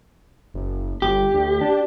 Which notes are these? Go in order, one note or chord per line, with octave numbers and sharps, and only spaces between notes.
F#1
G1 G4
D2
D4